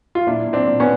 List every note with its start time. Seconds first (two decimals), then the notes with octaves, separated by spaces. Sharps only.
0.15 F4
0.27 A#2 D4 E4
0.47 A#2
0.53 C4 D4
0.66 A#2
0.80 B3 C#4